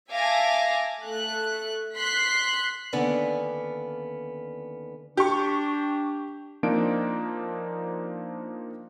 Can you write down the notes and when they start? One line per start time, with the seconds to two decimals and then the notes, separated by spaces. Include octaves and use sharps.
0.11 E5 F5 G#5 A5 D6 A#6
1.04 A3 F#6
1.95 C6 F#6 B6 C7
2.93 D#2 D3 B3 C#4 D5 F5
5.17 D4 G4 C#6
6.63 F3 A#3 C4 D4 D#4 D7